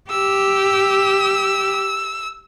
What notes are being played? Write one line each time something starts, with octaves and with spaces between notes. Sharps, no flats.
G4 E6